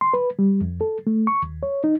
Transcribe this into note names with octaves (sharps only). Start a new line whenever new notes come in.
C6
B4
G3
F2
A4
A3
C#6
D#2
C#5
D#4